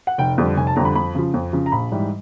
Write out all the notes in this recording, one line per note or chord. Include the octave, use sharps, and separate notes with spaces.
F#5
F1 G5
F2 D3 G3
F1 G#5
A5
F2 D3 G3 A#5
B5
F2 B5
C#3 F3
F2
C#3 F3
A#5
A#1 B5
G#2 E3 G3